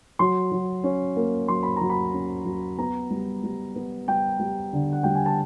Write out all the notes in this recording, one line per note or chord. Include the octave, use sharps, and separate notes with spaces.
F#3 C6
F#3
C#4
A#3
F#3 C6
B5
F#3 A#5
B5
C#4
F#3
B3 A#5
G3
G3
B3
G3 G5
G3
D3
F#5
G3 G5
G#5
A5